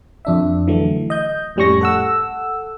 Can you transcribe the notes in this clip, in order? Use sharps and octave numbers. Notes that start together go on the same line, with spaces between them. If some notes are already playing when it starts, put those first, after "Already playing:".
F2 D4 E5
D3 E3 F#3 A3
D#5 G6
F2 A2 G3 C#4 C#6 A#6
A4 F#5 E6